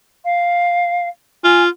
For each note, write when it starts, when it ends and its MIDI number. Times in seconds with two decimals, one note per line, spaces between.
0.25 1.09 77
1.44 1.68 65
1.44 1.63 80